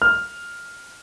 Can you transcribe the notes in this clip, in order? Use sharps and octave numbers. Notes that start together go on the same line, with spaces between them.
F6